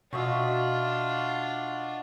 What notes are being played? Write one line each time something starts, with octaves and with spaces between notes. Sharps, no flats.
B2 D4 F4 F#4 D#5 E5